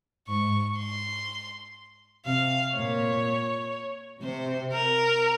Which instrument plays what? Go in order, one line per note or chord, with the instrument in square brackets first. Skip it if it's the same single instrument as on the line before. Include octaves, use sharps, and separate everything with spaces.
[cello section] G#2 [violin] C#6
[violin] C6
[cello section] C3 [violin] F5
[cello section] A#2 [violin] C#5
[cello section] C3 [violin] C5
[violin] A#4